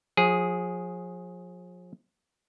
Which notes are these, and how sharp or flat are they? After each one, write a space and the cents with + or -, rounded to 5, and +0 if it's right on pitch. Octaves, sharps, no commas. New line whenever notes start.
F3 +40 G#4 +0